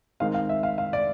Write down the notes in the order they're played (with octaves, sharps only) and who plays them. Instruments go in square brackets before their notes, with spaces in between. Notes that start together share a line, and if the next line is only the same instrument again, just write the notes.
[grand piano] D#3 G#3 C4 F5
F5
E5
F5
F5
D5